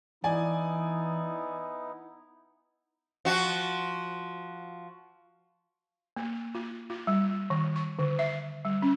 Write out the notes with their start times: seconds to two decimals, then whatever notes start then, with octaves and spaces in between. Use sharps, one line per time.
0.24 E3 B3 D#4 E4 D5 G#5
3.25 F3 F#4
6.16 A#3
6.55 F4
6.90 F4
7.07 G3
7.50 D#3
7.76 C#6
7.99 D3
8.19 E5
8.65 G3
8.82 C#4